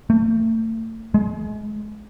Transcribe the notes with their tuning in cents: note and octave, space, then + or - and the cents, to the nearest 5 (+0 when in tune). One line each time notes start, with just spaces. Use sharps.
A3 +35
G#3 +30